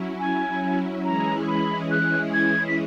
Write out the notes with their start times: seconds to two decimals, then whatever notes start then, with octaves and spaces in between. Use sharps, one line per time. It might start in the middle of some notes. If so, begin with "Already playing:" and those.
Already playing: F#3 C#4 E4
0.20 G#5
1.05 E3 G#3 C#4 E4 G#4 A#5
1.48 B5
1.91 F#6
2.34 G#6
2.68 B6